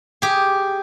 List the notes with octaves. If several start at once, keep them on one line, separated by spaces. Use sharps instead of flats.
G4 G#4